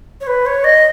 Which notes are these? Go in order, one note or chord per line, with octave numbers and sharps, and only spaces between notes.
C#5
B4
C#5
D#5